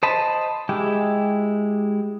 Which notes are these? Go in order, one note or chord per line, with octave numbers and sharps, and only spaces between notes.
C5 D#5 A5 B5
G#3 E4 G4 G5